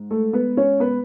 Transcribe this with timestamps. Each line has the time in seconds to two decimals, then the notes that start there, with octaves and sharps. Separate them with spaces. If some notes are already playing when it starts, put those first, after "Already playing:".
Already playing: G#2
0.11 A3 A4
0.33 B3 B4
0.57 C#4 C#5
0.80 B3 B4